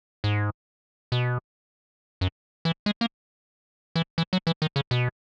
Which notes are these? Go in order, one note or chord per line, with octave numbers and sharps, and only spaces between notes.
G#2
B2
F#2
E3
G#3
A#3
E3
E3
F#3
E3
D#3
C#3
B2